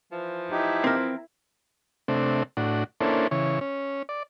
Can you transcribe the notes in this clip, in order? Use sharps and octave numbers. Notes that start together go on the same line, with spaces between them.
E3 F3
D#4 E4 G4
C4 A#4
C3 A3 C4 D4
A2 D4 F#4
A#3 C#4 D4 E4 A4 C5
C#3 E3 C#5
C#4
D5